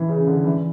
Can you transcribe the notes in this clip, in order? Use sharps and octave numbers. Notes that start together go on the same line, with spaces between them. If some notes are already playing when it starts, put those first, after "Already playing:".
Already playing: E3
C#3
D3
E3